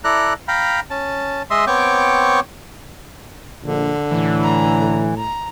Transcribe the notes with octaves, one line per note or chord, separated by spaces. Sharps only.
E4 A4 D5 A#5 F#6
F5 G5 A#5 B5
C#4 A5
G#3 D#5 E5 C6
B3 C4 C#5 G5 C#6 D6
A#1 D3
A2 E3
A#5
A#5